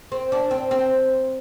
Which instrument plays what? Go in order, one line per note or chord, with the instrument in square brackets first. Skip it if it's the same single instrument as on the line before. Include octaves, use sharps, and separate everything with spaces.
[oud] C4
D4
C4
C4